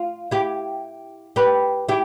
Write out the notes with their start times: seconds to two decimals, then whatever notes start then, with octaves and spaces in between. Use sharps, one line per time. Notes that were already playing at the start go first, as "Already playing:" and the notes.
Already playing: F4
0.31 E4 G4
1.36 G4 B4
1.89 E4 G4